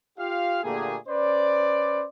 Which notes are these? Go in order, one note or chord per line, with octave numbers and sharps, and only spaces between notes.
F4 G4 F5
A#2 D3 A3 A#3 G4 G#4
C#4 B4 C5 D5